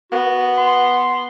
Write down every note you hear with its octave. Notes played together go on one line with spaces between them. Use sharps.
B3 F#4
C6